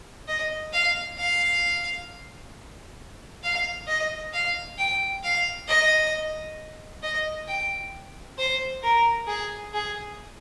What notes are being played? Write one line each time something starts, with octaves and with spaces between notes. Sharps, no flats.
D#5
F5
F5
F5
D#5
F5
G5
F5
D#5
D#5
G5
C5
A#4
G#4
G#4